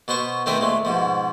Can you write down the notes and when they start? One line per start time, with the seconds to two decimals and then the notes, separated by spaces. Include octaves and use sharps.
0.08 B2 B3 C5 C#6
0.46 D#3 A3 C4 A#4 B4
0.60 A#2 G#3 A3
0.85 G#2 B2 F3